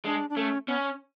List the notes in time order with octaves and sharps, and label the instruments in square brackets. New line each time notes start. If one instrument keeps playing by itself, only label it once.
[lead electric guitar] G#3 [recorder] D4
[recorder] D4
[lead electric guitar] A3 [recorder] C#4
[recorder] B3 [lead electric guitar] C#4